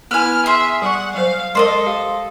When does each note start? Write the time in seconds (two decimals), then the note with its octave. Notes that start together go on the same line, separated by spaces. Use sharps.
0.11 B3 E4 B4 G#5 F6
0.46 G#4 E5 C6
0.82 G3 F#5 C#6
1.15 F#3 C5 F5
1.55 G#3 A4 A#4 C5 D5 D#5
1.86 G4 F5